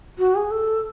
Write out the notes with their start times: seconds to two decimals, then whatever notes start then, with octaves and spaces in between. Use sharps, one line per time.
0.19 F#4
0.35 G#4
0.51 A4